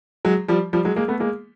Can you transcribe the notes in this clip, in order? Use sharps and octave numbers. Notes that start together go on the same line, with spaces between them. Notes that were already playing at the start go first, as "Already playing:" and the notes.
F#3 G#3
F3 G3
F3 G3
F#3 G#3
G#3 A#3
A3 B3
G#3 A#3